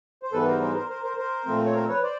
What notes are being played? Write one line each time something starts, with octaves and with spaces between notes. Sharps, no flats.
C5
G#2 E3 G3 B3 A4 B4
A#4 C5
A#4 C5
A#4 C5
A#4 C5
A#4 C5
A#4 C5
A#2 F3 A3 C4
C#5
A#4 C5
B4 C#5
C5 D5